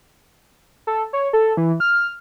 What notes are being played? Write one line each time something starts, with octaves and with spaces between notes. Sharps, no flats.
A4
C#5
A4
E3
F6